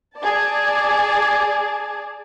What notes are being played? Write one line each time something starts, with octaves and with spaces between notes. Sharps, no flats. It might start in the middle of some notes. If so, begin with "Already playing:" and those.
G#4 D5 A5